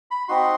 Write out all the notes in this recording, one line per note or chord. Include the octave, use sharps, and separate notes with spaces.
B5
C4 D#4 F#4 C6